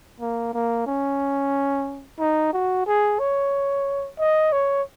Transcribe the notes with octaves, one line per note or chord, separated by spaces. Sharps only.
A#3
A#3
C#4
D#4
F#4
G#4
C#5
D#5
C#5